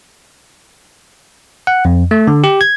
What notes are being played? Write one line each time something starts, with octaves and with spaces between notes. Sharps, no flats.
F#5
F2
A3
D3
G4
G#6